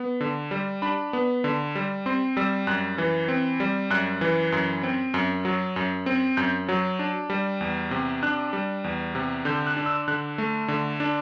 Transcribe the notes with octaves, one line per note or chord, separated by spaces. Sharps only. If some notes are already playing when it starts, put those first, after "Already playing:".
Already playing: B3
D3
G3
D4 B5
B3
D3
G3
C4 C6
G3 E6
F#2 F#6
E3
C4
G3
F#2 F#6
E3
F#2
C4
F#2
F#3
F#2
C4
F#2 G6
F#3
D4
G3
E2
C3
D4 F#6
G3
E2
C3
D3 G6
F#6
D4
E6
D3 F#6
A3
D3
D4